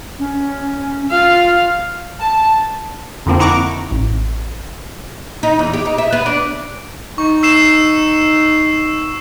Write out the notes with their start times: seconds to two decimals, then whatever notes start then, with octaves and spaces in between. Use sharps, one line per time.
0.19 C#4
1.11 F4 F5
2.21 A5
3.26 F2 D3 F3 A#3 C4
3.39 D#4 E4 F#5 A#5 C#6 D6
3.91 A1
5.43 D#4
5.59 E2
5.73 G4
5.86 D#4
5.98 E5
6.13 B3
6.26 D4
7.18 D#4 C#6
7.43 E6 C7 E7